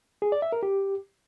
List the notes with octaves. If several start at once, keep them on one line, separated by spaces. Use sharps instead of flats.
G#4
D5
E5
A#4
G4